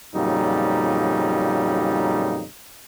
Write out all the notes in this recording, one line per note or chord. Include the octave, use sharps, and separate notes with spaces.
F2 A#2 C#3 F#3 G3 D#4